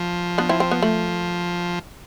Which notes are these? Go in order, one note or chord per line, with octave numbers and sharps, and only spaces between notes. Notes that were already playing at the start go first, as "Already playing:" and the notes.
Already playing: F3
B3 D4
C4 E4
C4
B3
A3